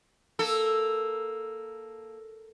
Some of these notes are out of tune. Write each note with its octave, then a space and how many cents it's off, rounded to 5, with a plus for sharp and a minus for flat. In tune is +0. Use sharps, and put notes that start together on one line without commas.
A#3 +0 A4 +0